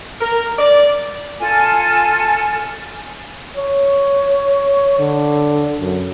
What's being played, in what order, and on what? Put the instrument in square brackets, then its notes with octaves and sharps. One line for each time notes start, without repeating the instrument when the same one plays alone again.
[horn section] A#4
D5
[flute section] F4 A4 G#5
[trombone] C#5
D3
F#2